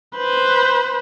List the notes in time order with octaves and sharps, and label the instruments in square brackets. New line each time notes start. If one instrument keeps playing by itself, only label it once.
[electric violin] B4 C5